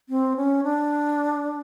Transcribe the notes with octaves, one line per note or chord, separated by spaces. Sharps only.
C4
C#4
D4